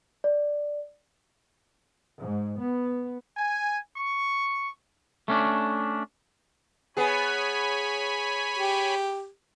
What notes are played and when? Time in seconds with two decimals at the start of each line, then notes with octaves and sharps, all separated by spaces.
0.24 D5
2.19 G#2
2.58 B3
3.37 G#5
3.97 C#6
5.28 A3 C#4 D4
6.97 B3 G#4 C#5 G#5 B5
8.58 G4